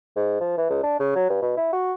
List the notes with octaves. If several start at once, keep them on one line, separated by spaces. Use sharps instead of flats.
G#2
F3
E3
C#2
D4
C#3
F#3
G2
B2
E4
F#4